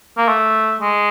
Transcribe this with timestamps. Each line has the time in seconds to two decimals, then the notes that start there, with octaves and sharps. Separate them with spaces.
0.18 A#3
0.29 A3
0.81 G#3